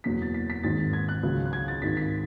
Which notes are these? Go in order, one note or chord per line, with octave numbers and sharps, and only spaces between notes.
F#1 E2 B2 F#3 B6
A6
B6
B6
G#1 G#2 D#3 A6
G#6
F#6
C#2 C#3 F#3
F#6
G#6
A6
G#1 G#2 D#3 B6
B6